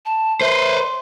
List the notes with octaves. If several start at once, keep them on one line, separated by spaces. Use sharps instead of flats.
A5
B4 C5 E5
C6